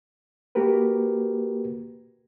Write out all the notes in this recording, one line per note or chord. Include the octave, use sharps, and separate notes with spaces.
A#3 F#4 G4 A#4 B4